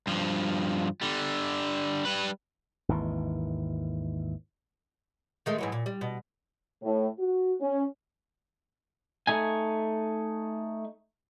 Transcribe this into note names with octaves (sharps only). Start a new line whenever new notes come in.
G2 F3
D3 G3
G3 B4
G#1 D#2 E3
D#3 G#3 A3
G#2 E3 F#3
A#2
G3
B2
A2
F#4
C#4
A3 D#4 G#5